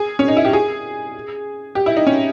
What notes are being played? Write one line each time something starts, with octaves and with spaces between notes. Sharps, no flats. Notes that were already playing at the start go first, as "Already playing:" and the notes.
Already playing: G#4
C#4
D#4
E4
G4
G#4
G4
E4
D#4
C#4